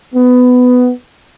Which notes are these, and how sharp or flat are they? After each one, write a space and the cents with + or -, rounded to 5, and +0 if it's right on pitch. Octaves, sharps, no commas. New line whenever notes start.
B3 +15